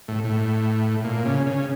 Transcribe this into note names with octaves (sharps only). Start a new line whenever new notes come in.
A2
A2
A#2
C#3
C#3